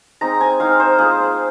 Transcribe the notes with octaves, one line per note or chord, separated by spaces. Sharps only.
G#3 C4 D#4 A#5
G#5
G#3 C4 D#4 F5
C5
A#3 F4 G#4